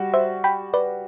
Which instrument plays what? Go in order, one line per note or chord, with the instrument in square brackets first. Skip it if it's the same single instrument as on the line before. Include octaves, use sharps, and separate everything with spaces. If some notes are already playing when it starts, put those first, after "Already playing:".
Already playing: [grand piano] G3 F#4
[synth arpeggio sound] C5 E5
G5 B5
B4 D5